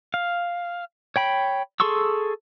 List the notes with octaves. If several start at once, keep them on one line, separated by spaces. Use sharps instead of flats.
F5
C#5 G5 B5
G#4 A4 C6 C#6 E6